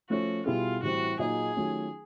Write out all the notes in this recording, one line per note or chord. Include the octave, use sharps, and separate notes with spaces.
F3 A3 C#4 F#4
B2 G3 B3 E4 F4 G#4
A2 E3 G3 C4 E4 F#4
A#2 F#3 A#3 D#4 G#4
D#3 F#3 A3 C#4 F4